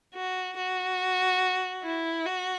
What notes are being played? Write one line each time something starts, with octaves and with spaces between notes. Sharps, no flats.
F#4
F#4
E4
F#4